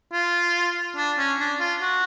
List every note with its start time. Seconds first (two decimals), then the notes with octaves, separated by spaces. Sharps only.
0.13 F4
0.97 D4
1.18 C#4
1.40 D4
1.60 F4
1.81 F#4